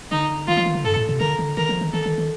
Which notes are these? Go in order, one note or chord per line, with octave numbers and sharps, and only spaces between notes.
D3 D#4
D#3 F4
F3
D#3
D3
G2 A4
A2
C3
D3 A#4
D3
D#3 A#4
F3
D#3
D#3 A4
D#3
D#3